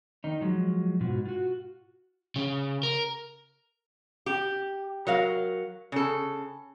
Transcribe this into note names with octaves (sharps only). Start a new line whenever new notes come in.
D#3 D#4
F3 F#3 G#3
G#2 B2 F4 F#4
F4 F#4
C#3
A#4
G4
F#3 A#4 F5
C#3 A4